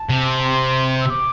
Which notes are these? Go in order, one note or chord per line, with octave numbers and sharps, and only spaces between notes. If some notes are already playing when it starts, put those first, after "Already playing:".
Already playing: A5
C3
C6
E6
D6